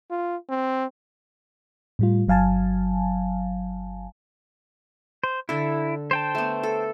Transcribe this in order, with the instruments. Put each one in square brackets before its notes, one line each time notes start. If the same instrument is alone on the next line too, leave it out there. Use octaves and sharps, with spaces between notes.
[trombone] F4
C4
[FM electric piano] A2 G3 F4
G1 F#3 F5 G#5 A5
[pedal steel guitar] C5
[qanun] D3 A4 [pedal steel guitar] E4
[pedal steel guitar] C5 G5 A5
[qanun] A3 B3
A4